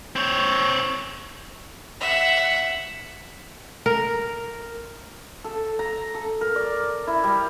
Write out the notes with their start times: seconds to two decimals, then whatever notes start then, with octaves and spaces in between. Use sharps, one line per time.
0.16 C4 C#5
2.00 E5 F#5
3.86 A#4
5.44 A4
5.79 A#5
6.14 A4
6.41 A#4
6.56 D5
7.07 E4
7.24 G3